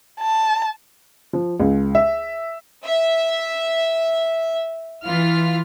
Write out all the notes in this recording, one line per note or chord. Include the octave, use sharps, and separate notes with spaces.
A5
F3
C#2
E5
E5
E3 F4 F6